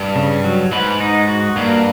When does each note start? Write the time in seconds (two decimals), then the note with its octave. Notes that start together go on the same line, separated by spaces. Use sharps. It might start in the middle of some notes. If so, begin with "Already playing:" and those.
Already playing: G2
0.16 C#3
0.44 F#3
0.72 G#2 B4
1.00 D#4
1.28 F#4
1.56 G2 A#3